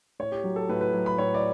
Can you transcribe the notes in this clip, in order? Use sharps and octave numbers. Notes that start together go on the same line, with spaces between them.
A2 C#5
G4
F#3
A4
A2 B4
B4
F#3
B5
A2 C#5
D5